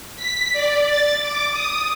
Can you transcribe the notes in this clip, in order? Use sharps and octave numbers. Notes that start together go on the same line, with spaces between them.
B6
D5
A6
D6
D#6